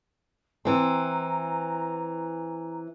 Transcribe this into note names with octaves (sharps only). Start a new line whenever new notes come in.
E3 C4 A#5